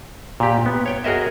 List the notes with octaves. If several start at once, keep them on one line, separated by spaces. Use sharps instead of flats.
A#2 G4
B3
C#5 G5
F#4 G#4 A#4 D#5 E5